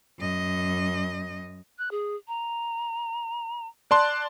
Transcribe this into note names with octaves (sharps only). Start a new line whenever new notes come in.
F#2 D#5
F#6
G#4
A#5
D5 A5 C6 F#6